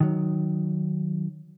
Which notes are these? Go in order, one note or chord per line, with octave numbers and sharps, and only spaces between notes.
D#3 F#3